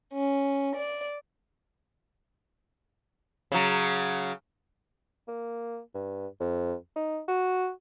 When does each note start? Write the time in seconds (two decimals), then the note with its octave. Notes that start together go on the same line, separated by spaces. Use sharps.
0.12 C#4
0.75 D5
3.52 C#3 F#3
5.28 A#3
5.94 G2
6.40 F2
6.96 D#4
7.28 F#4